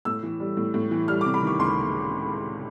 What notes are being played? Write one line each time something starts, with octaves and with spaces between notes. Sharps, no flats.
A2 E6
E3
G3
A2
A2
E3
G3 F6
C3 D6
B5
D#3 C#6
C#2 C6